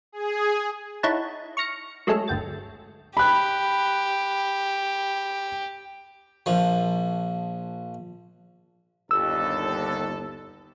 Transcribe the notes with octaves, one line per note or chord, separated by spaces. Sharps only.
G#4
D#4 E4 C#5 F#5 A5
C#6 F6 A#6 C#7
F#3 G#3 A3 C#4 A4
G1 D2 G5 A6
G4 B5 F#6
A#1 F3
G1 D#2 A4 E6